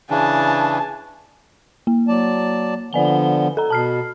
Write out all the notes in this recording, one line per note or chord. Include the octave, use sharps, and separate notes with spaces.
C#3 E3 D4 G#5 A5
A#3
F#3 D5 A5
D3 F3 B3 D5 G#5 G7
A4 A#5
B2 A5 F6 C7